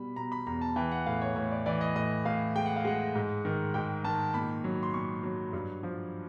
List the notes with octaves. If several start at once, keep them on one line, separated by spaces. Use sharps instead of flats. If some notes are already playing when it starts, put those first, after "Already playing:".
Already playing: B2 G3 B5
B2 A#5
B5
E2 A#5
A5
E3 G5
F#5
A2 F5
C#5
A2 C#5
D5
E3 D5
D#5
A2 D#5
A2 F5
G#3 G5
F#5
F5
G#3 F#5
G#2
D#3
G#2 G5
D#3 A5
A#2 B5
F#3
C6
A#2 C#6
F#3
G2
F3